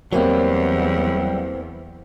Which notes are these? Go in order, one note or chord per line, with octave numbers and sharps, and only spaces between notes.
E2 E3 F#3 G3 A#3 C4